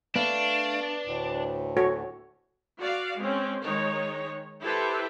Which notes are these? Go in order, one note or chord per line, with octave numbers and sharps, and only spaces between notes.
A3 B3 D4 F5
D2 A2
F#4 A4 C#5
F#4 D5 F5
G#3 C4 C#4
D#3 G#3 D#4 C#5
E4 G4 A4 B4 C5 E5